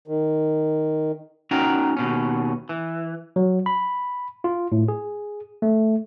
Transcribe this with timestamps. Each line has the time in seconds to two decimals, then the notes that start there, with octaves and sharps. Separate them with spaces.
0.08 D#3
1.51 C#4 D#4 F#4 A#4 G5 A#5
1.97 D#2 B2 C#4
2.69 E3
3.36 F#3
3.66 B5
4.44 F4
4.72 A2
4.88 G#4
5.62 A3